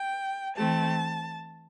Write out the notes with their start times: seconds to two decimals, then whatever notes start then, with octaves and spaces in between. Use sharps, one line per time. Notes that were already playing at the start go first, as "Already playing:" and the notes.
Already playing: G5
0.56 E3 A3 C4 A5